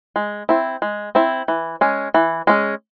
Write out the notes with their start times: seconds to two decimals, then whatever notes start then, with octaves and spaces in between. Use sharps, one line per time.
0.16 G#3
0.49 C4 E4
0.82 G#3
1.15 C4 E4
1.48 E3
1.81 G#3 C#4
2.14 E3
2.47 G#3 C#4